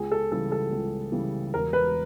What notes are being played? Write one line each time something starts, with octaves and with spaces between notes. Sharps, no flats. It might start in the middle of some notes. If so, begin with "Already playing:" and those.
Already playing: C#2 G#4
A4
C#3 E3 G3 A4
A4
C#2
C#3 E3 G3
E1 A#4
B4